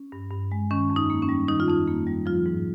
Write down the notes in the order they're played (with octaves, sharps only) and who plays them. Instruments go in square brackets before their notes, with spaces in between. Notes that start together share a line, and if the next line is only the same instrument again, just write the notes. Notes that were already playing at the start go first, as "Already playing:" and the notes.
Already playing: [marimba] C#4
G2
G2
G#3
D#3 C#4
F2
D#4
A#3
C#4
G3
D#3 D#4
F4
F2 D#4
A#3
G3
F3 F4
G#2